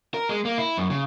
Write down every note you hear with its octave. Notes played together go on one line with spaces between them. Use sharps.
A#4
G#3
A#3
E4
F#2
C#3